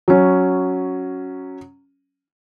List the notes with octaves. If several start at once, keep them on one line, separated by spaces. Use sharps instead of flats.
F#3 C#4